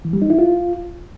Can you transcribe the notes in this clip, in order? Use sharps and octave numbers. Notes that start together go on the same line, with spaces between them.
E3
G3
D#4
E4
F4